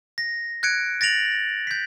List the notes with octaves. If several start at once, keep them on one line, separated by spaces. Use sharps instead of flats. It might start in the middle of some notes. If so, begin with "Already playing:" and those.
A#6
F#6 G#6 C#7 D7
A6 A#6 D7 F7 F#7
G6 B6